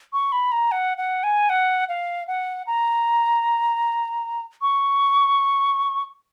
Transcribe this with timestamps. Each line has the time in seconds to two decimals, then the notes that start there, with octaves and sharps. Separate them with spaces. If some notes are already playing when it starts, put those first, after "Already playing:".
0.13 C#6
0.32 B5
0.52 A#5
0.72 F#5
0.98 F#5
1.23 G#5
1.50 F#5
1.89 F5
2.28 F#5
2.67 A#5
4.62 C#6